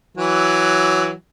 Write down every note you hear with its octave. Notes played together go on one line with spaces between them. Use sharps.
E3 F#3